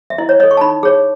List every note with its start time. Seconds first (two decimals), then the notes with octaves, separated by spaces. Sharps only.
0.10 E5
0.18 E4 D#5
0.29 C#5
0.40 A4 C#5 D#5
0.51 C#6
0.57 A5
0.61 D#4 B5
0.83 G#4 C#5